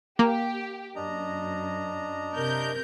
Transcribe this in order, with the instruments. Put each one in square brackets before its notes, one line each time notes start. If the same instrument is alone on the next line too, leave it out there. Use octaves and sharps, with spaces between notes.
[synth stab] A#3 [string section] G4
[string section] F#2 [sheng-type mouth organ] D4 D#5 A#5
[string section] C3 A#4 G6